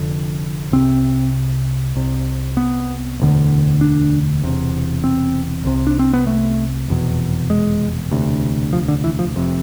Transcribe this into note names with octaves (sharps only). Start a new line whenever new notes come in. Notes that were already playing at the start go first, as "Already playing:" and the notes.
Already playing: F1 F2 D3
C2 C3 C4
C2 C3
B3
E1 D2 D3
D4
E1 E2 C3
C4
C2 C3
D4
C4
B3
A3
F1 E2 B2
G#3
E1 D2 C3
F3
D3
E3
F3
F1 F2 C3